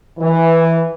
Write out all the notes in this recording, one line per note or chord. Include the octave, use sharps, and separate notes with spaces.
E3